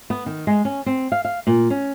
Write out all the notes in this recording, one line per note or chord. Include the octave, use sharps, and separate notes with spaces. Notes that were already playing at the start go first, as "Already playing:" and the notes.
B3
D#3
G#3
C#4
C4
F5
F5
A#2
C#4